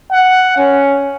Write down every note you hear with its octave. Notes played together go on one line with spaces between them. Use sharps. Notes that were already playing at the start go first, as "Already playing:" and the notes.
F#5
C#4